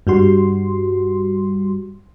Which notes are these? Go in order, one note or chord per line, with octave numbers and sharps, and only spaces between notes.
G2 G3 F#4 C6